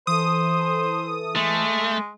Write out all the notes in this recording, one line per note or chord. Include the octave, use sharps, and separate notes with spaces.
E3 A4 C5 D#6
G#3 A3